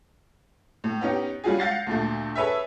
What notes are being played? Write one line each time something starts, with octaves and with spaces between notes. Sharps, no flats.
A2
B3 C#4 D#4 G4
G3 G#3 C#4 F4 F#4 G#4
F5 F#5 G6 A6 A#6 C7
D2 A#2 A3
G#4 A4 B4 C#5 E5